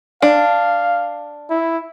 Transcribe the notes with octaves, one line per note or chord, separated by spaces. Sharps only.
D4 F5
E4